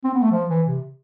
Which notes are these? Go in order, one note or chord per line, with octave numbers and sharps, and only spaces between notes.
C4
B3
A3
F3
E3
C3